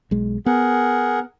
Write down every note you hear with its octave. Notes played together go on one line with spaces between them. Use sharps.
B1 G#3
B3 G#4 A#4 F#5